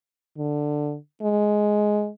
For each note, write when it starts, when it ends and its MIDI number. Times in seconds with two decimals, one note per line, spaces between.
0.38 0.96 50
1.22 2.10 56